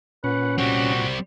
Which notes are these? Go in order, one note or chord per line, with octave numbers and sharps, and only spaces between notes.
A#2 C#4 B4 F#5
G3 C4 F#4